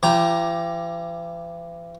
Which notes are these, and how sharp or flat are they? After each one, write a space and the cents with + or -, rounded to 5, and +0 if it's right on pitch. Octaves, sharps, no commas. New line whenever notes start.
E3 +45 G4 +0 A#5 +15